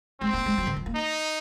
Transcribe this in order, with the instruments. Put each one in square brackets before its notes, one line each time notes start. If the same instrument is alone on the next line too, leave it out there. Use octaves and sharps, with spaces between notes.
[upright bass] G#3 [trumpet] C4
[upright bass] A#3
G#3
F#3
D#3
F3
A#3
[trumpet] D#4